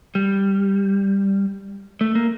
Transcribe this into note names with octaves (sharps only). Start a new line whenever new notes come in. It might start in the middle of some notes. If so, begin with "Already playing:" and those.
G3
A3
A#3